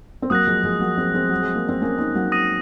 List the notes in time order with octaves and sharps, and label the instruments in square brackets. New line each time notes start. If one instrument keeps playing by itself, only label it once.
[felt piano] C4
[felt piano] F#3 A#3 [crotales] D#6 F#6 A#6
[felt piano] F3 G#3
F3 G#3
F#3 A#3
G#3 C4
G#3 C4
F#3
G#3
A#3
C4
A#3 C#4
C4 D#4
F#3 A#3
[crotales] D#6 A#6 D#7